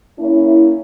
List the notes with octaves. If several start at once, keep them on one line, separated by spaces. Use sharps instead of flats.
A#3 C#4 E4